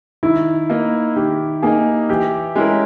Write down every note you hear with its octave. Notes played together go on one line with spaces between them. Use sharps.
D#3 E4
A#3 D#4
D#3 G4
A#3 D#4 G#4
E3 G4
G#3 C#4 E4 A#4